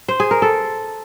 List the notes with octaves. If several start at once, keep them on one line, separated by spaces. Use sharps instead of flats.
C5
G#4
A#4
A4